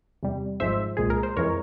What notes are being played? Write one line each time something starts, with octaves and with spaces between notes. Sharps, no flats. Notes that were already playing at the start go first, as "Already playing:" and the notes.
E2 C3 G3
G#1 G#2 F3 G#3 C5 E5
C2 A#2 G#3 G#4
A#4
C5
F2 E3 G#3 A#4 C#5